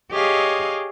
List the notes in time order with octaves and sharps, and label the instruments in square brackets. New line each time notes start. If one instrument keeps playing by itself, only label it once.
[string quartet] G4 G#4 C#5 D#5 F5